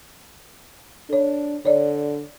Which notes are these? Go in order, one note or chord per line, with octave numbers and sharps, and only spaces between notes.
D4 A4 C#5
D3 C#5 D5